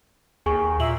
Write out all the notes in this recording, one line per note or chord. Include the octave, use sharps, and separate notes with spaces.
D#2 G#4 G#5 C#6
A#2 E5 F#7